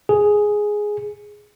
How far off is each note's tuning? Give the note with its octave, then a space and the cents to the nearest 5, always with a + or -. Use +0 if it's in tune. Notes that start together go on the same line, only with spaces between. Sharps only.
G#4 +5